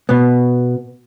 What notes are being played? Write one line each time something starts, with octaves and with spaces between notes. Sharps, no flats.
B2 B3